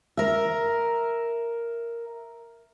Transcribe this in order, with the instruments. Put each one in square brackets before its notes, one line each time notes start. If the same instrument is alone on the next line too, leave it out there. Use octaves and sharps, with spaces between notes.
[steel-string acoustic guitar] A#4 E5